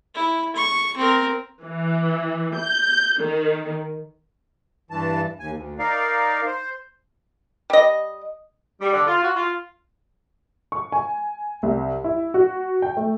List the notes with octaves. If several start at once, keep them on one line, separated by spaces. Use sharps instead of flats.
E4
C#6
C4 A#4
E3
G6
D#3
G2 E3 A5
D#2 G#5
D2
D#4 A#4 D5 F5
C5
G3 D#5
G3
D3
F4
F#4
F4
C#6
G#5
C2
E4
F#4
G5
A3